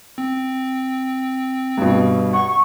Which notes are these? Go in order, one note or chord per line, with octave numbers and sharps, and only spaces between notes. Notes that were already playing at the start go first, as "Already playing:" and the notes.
C4
G2 B2
F#5 C#6